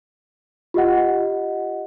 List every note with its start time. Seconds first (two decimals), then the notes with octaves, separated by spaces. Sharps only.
0.74 F4 G4 D#5 F#5